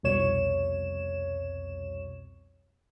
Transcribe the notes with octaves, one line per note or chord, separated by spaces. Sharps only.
C2 F2 B2 C#5 E7